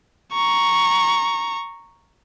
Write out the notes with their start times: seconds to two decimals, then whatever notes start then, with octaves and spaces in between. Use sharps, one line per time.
0.33 A#5 C#6